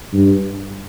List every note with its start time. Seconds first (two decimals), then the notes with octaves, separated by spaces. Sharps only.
0.12 G2